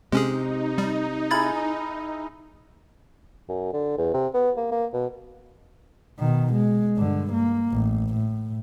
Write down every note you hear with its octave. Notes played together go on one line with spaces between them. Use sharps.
C3 G#3 C#4 D#4 G#4
G3
E4 G#4 A#4 B5 G#6 A6
F#2
D3
E2
C3
B3
A#3
A#3
B2
B2 D#3
G#3
G2 D3
A#3
A1
A2